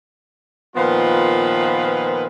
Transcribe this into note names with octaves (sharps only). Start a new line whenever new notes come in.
A#2 D#3 F3 B3 F4 B4